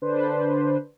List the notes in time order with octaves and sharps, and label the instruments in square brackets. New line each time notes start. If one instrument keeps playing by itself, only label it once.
[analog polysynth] D3 D4 B4 C5